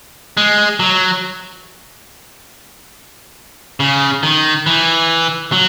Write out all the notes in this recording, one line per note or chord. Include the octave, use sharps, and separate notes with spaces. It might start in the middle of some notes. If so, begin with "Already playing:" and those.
G#3
F#3
C#3
D#3
E3
F#3